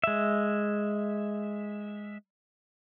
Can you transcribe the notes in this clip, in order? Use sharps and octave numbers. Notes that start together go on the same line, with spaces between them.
G#3 E5